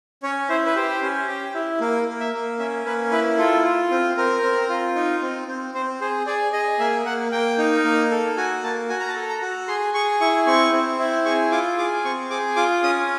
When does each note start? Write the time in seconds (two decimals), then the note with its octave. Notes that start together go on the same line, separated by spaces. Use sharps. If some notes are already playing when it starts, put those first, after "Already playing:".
0.23 C#4 C#5
0.49 E4 C5
0.66 B4
0.76 G4 C5
1.02 C#4
1.28 G4
1.55 E4
1.81 A#3
2.07 A#3
2.20 E5
2.33 A#3
2.59 C#4 E5
2.85 A#3 B4
3.11 E4 B4
3.38 F4 A4
3.64 F4
3.91 C4
4.17 C4 A#4
4.43 C4
4.69 F4
4.96 D#4
5.22 C4
5.48 C4
5.74 C4 C5
6.01 G#4 C5
6.26 G#4 D5
6.53 G#4 D#5
6.79 A#3 E5
7.05 A#3 F#5
7.32 A#3 G5
7.58 D#4
7.84 A#3
8.11 A4
8.37 F#4 G#5
8.63 A#3 A5
8.89 F#4 G#5
9.00 A#5
9.08 A5
9.15 A4
9.29 A#5
9.42 F#4
9.68 G#4 C6
9.94 G#4 C#6
10.20 E4 C#6
10.47 C4 C#6
10.73 C4
10.99 E4
11.25 G#4 C#6
11.51 F4 D6
11.78 G#4 D6
12.04 C4 C#6
12.30 G#4 D6
12.56 F4 D6
12.83 C#4 D#6